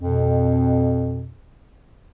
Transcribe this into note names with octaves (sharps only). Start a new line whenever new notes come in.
F2 B2